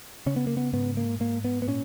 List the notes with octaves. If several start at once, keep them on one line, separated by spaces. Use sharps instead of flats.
C#3 C#4
B3
A#3
B3
G#2 B3
A#3
G#2 A#3
B3
B3
A#2 C#4